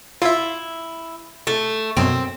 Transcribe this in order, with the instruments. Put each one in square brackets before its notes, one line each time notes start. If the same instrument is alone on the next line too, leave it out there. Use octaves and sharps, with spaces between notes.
[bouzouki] E4 [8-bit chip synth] F4 E5
[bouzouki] A3
[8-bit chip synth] F#2 B2 [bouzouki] C4